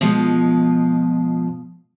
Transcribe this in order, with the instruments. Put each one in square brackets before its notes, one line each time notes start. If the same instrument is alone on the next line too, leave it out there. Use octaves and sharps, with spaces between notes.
[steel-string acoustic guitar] B2 F3 G#3 F4